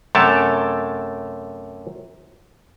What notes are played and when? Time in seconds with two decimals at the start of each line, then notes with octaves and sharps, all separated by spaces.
0.15 F#2 C3 A3 C#5 G5 A5